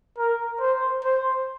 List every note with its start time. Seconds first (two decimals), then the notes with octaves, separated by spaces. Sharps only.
0.18 A#4
0.60 C5
1.04 C5